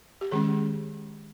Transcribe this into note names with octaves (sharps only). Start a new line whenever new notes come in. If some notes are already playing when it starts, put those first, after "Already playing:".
G4
D#3 G#3 C#4 G#4